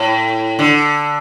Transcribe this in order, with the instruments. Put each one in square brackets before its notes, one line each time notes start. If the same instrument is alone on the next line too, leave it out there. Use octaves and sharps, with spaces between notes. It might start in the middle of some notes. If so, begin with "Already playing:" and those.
Already playing: [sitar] A2
D3